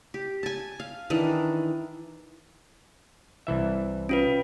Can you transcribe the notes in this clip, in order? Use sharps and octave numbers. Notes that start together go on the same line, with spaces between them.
G4
G#5 A5
F5
D#3 E3 D4
C2 E3 E5
C#4 F4 B4